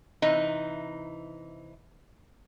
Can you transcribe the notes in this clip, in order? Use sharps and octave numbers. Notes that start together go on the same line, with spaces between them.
C3 E3 D#4